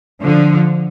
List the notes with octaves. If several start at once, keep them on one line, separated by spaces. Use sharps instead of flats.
D3 F3